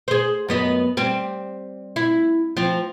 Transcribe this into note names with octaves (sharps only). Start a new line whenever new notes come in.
G#4 C5
F#2 B3 D#5
G3 C4
E4
F3 C4